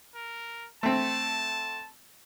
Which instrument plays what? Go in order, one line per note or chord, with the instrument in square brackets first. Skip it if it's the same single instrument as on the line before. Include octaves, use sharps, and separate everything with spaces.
[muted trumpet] A#4
[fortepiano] A3 C4 [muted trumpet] A5